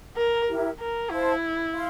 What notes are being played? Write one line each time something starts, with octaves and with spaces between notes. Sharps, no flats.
A#4
E4 G4 A#4
A#4
E4 C5 F5 A5
F5 C6